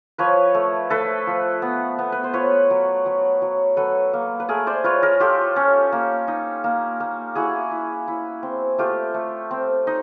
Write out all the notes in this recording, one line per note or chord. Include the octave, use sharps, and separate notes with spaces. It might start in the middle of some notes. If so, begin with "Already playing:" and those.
F3 B4 C#5
A3
A3 A4 B4
F3
B3
B3
B4
C5
F4 B4 C#5
F#3
F#3
F#3
F#3 A4 B4
A#3
B4
A3 G#4 A#4
C5 D5
F4 B4 C#5
G#4 A#4
F4 G4 A4
C#4
A#3
D#4
A#3
A#3
E4 F#4 G#4
E4
E4
C4
A3 F4 G4
A3
C4
D#4